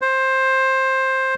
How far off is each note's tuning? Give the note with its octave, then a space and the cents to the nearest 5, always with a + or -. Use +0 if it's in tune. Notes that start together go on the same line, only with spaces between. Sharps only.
C5 +15